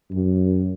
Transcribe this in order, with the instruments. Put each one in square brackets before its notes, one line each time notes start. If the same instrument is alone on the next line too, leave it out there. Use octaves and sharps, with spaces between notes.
[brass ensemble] F#2